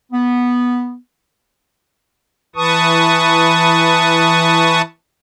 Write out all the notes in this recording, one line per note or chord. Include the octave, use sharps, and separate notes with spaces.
B3
E3 B4 A5 C#6 D#6